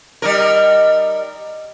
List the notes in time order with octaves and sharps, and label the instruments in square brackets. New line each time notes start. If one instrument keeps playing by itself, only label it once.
[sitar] G3 D#4 A#4